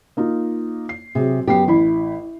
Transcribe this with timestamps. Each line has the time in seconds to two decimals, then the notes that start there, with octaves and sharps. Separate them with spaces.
0.17 A#3 D#4 F4
0.89 C7
1.15 C3 F#3 G#4
1.48 F#2 B3 G4 C7
1.68 A1 E4 B5